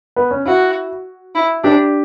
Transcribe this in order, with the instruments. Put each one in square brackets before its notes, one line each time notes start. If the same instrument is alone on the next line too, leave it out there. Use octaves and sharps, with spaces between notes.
[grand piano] B3
C#4
[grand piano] E4 [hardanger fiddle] F#4
[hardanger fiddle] E4
[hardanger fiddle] D4 [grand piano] G4